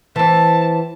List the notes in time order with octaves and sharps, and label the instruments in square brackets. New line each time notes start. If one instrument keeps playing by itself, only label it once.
[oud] E3 C4 [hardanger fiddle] A5